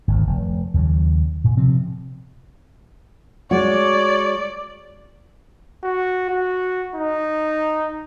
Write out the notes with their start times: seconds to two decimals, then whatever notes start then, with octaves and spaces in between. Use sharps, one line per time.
0.08 G#1 D2
0.26 F1
0.74 D#2 C#3 F#3
1.44 A#2
1.57 C3 F3 C4
3.51 G#3 F#4 C#5 D5
5.84 F#4
6.29 F#4
6.96 D#4